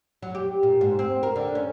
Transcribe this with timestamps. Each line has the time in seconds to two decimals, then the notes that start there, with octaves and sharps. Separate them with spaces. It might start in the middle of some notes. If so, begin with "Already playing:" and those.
0.22 F#3
0.35 G4
0.63 A#2
0.81 G#2
0.99 C4
1.23 A#4
1.36 D3
1.55 C#4